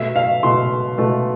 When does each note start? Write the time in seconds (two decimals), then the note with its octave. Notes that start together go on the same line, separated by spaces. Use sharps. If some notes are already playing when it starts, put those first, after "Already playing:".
Already playing: B2 A3 E5
0.16 F5
0.43 B2 A3 C6
0.98 B2 A3